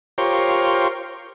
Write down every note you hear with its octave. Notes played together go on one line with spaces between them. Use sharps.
F4 G4 A#4 C5 C#5